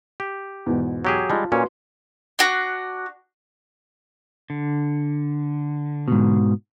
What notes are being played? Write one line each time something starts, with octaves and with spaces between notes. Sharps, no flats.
G4
E2 G#2 B2
F#3 G4 G#4
G3 G#3 F4 A5
A#2 C#4 F#4 B4 C6
D4 F#4
D3
G#2 B2